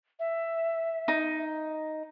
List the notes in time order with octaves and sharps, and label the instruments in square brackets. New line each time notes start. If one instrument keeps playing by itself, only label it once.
[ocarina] E5
[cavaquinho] D#4